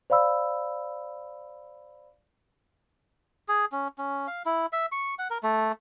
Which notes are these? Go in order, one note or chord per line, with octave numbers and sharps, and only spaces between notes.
C5 D5 F5 B5 E6
G#4
C#4
C#4
F5
E4
E5
C#6
F#5
A#4
A3